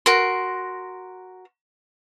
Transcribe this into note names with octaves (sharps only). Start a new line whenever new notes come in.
F#4 A#4 C6